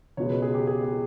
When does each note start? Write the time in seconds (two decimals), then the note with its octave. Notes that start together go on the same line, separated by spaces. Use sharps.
0.17 C#2 B2 G#3 C#5
0.29 B4
0.42 G#4
0.54 G4
0.67 G#4
0.83 G#4